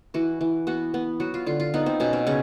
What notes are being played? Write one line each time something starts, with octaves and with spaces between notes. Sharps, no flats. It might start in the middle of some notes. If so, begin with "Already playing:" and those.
E3 F#4
E3
B3 F#4
B3
F#3 F#4
F4
D3 F4
F4
B3 D#4
C4
B2 C#4
C4
C#3 C#4